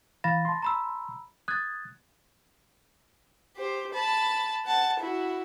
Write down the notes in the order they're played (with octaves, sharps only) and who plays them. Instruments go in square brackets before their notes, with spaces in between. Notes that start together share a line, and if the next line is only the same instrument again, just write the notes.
[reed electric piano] E3 F5 [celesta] B5 A6 A#6
[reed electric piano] A5 C6
[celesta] A#5 B5 E6
[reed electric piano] D#6 G#6 [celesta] F#6 A6
[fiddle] G4 C5
A5 B5
F#5 A5
E4 F#4